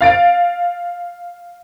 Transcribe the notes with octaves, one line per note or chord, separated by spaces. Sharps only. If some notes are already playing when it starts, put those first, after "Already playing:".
F5 A6 D7